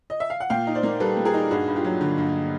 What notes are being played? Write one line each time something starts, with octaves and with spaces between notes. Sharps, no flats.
D#5
E5
F5
F#5
A#2 F5 G5
D#4
C5 D5
A#3
G3 A4 B4
A#2
G#4 A#4
D#4
G2 F#4 G#4
G2
F4 G4
F#3
D3
G2